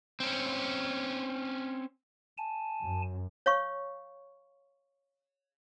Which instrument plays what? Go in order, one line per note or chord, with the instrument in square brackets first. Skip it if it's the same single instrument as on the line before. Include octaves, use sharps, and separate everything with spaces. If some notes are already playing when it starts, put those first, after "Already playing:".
[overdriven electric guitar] C4 C#4
[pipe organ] G#5 A5
[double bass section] F#2
[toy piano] C#5 F5 C#6